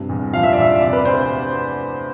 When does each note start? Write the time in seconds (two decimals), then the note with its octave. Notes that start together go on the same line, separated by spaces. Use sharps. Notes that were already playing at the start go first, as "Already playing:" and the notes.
Already playing: G2 C3
0.09 E2
0.33 F3 F5
0.43 E5
0.53 D5
0.58 E2 E5
0.81 C3 D5
0.93 B4
1.05 D2 C5